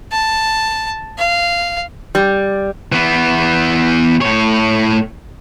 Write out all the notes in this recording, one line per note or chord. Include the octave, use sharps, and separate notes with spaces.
A5
F5
G3
E3 B3
A2 C#5